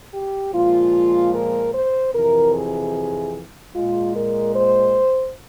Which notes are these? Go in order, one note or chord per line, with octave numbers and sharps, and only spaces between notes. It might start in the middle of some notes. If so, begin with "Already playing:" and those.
G4
A#2 F3 G#3 F4
A#4
C5
F2 C3 E3 A#4
G#4
A#2 G#3 F4
A#4
C5